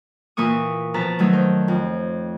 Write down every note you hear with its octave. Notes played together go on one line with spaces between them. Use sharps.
A#2 E3 A#3 C#6 D#6
B2 F3 B4 A5 A#5
D#3 F#3 A3 D#4
C5
F2